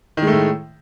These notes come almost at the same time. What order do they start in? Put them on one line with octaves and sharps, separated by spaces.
D#3 G#3 A3 A2